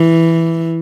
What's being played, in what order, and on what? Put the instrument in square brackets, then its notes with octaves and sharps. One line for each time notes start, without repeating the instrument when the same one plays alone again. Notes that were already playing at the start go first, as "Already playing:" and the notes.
Already playing: [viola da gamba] E3